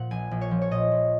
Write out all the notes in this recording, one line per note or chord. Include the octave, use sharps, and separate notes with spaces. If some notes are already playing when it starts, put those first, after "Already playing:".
Already playing: A#2 F3 F#5
A#1 G#5
A#1
C#5
F3
C#5
A#2 D#5
A#1